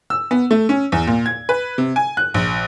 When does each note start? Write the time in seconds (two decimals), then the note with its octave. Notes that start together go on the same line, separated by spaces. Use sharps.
0.10 E6
0.31 B3
0.51 A3
0.69 C#4
0.92 E2
1.07 A#2
1.26 G#6
1.49 B4
1.78 C3
1.96 G#5
2.17 F#6
2.34 A#1